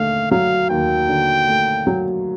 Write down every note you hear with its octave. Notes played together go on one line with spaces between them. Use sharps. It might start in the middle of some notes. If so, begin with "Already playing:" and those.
Already playing: D#2 D3 A3 F5
F#3 F5
D#2 G5
D3
A3
F#3